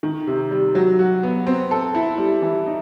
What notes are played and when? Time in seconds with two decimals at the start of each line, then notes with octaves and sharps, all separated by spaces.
0.03 D#3
0.27 C3
0.51 G3
0.75 F#3
0.99 F#4
1.23 B3
1.47 C4
1.71 A4
1.95 E4
2.18 G3
2.42 E3
2.66 D#4